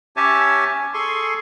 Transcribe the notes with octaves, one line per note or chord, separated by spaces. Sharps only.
C#4 G4 C#5 E5 G#5 A5
G#4 A4 G#5 C6 C#6